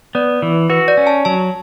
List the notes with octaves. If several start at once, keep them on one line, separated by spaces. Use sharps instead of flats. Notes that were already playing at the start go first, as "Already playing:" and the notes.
B3 D5
E3
F#4 B4
D5
C#4
A5
F#3 A5